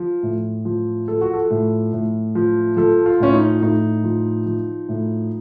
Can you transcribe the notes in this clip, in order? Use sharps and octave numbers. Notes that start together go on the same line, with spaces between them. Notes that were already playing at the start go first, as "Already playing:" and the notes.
Already playing: F3
A2
F3
F3 A4
F#4
A4
A2
A2
F3
F3 A4
F4
A2 C#4
D#4
A2 D#4
F3
F3
A2